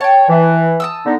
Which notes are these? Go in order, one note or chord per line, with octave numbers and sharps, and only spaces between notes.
C#5 G5 A5
E3
A5 D#6 E6
D3 B3 D#4